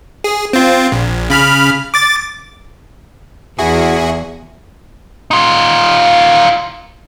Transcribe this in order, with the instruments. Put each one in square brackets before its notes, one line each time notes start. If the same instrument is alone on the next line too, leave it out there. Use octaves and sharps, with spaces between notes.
[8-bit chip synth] G#4
C4 F4
A#1
C#3 B5 F6
D6 A6
[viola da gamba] E2 [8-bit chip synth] E4 F#4 G#4
[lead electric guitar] D#4 F4